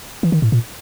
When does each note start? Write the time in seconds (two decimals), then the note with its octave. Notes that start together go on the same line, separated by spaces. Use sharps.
0.23 E3
0.32 D#3
0.42 A2
0.52 A#2